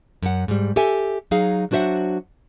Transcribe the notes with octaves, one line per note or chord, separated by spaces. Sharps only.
F#2 F#5
G#2 G3
G4 A4 E5 G#5
F#3 D#4 G#4 F5
F#3 D4 F#4 C5 E5 F#5